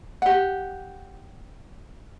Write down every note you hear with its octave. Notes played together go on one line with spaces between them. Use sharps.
G4 F#5